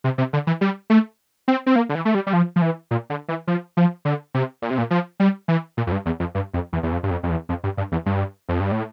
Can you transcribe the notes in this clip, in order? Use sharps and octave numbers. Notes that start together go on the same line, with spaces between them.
C3
C3
D3
E3
G3
A3
C4
C4
A#3
D3
E3
A3
G3
G3
F3
F3
E3
A#2
D3
E3
F3
F3
D3
C3
A#2
C3
A#2
F3
G3
E3
A#2
F2
G2
E2
F2
G2
F2
E2
E2
F2
G2
F2
F2
E2
F2
G2
G2
E2
G2
F2
G2
A2